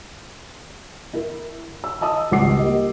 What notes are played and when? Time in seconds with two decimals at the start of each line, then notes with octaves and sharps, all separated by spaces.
1.14 E4 A#4
1.84 E6
2.01 D#5 A5 D#6 E6
2.31 G#1 C#2 G3 F#5 D6 C7
2.59 A#3 G4 D#5